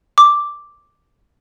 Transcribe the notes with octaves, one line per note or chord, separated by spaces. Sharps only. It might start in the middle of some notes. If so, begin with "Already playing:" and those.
D6